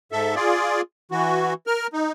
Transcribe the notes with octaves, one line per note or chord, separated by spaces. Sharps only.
G#2 A4 E5
F4 G#4 D5
E3 F#4
A#4 F6
D#4